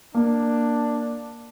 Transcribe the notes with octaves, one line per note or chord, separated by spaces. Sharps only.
A#3 D4